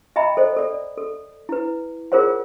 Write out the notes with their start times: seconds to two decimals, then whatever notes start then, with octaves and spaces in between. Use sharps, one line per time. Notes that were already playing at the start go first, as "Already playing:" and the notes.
0.16 D#5 E5 G5 A#5 B5
0.37 A4 C5 D5 D#5
0.56 A4 D5
0.97 A4
1.49 E4 B4
2.12 F4 G#4 A#4 C5 C#5 F#5